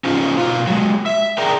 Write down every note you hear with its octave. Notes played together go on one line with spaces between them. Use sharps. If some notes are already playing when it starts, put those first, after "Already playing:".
C#4 D#4 F4 C5
B2 F4 F5
F#3 G#3
E5
G#4 A#4 D5 G5 A#5